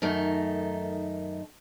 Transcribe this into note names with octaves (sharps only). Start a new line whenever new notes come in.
F#2 D#3 A3 D#4